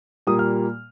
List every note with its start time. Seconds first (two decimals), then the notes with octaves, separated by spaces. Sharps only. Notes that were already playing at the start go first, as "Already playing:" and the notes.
0.27 A#2 G3 A#3 D#6
0.39 F6